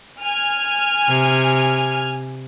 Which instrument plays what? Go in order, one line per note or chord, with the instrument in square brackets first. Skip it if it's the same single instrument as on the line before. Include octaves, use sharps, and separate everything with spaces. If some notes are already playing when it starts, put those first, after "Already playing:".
[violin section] G#5 F6
[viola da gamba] C3